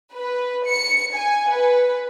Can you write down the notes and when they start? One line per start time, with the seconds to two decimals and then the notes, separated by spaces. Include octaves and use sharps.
0.13 B4
0.67 C#7
1.15 G#5
1.50 B4